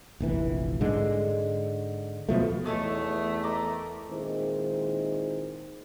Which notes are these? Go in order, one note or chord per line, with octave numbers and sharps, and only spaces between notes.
F1 A#1 E3
G#2 D3 G#3
B2 F3 A3
E2 A3 D#4 A4 C#5
A#4 D5 D#5
A#2 D#3 G#3 C4 E4 C5